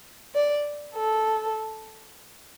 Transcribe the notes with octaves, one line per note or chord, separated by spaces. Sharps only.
D5
A4